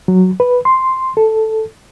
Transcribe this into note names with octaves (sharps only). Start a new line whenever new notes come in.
F#3
B4
C6
A4